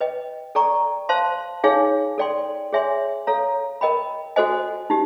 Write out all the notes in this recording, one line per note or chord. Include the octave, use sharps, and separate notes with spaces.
B4 D#5 G5
A4 D5 G5 A#5 C#6
C5 F5 A5 C6
D#4 G#4 C#5 F5 G#5
A4 D5 G5 C6
G#4 C#5 E5 G#5 C6
A4 C#5 F5 A#5
A#4 D#5 G5 B5
F#4 A4 C5 D#5 G#5
D#4 G4